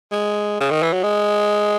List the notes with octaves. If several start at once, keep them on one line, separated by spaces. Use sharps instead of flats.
G#3
C#3
D#3
E3
F#3
G#3